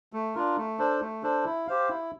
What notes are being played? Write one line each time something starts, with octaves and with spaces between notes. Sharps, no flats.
A3
D4 F4 A#4
A3
D4 A4 C5
A3
D4 A4 C5
E4
G4 C5 F5
E4